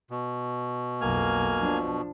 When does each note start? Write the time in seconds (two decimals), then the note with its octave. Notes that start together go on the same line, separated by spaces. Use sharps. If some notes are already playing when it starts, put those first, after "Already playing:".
0.11 B2
1.01 B1 F2 A#3 G#5 F6
1.58 F3 D4